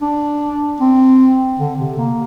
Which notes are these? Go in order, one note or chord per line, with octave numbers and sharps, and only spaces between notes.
D4
C4
D3
C3
A#3